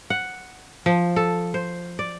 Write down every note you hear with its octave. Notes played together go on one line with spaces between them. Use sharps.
F#5
F3
A4
C5
D5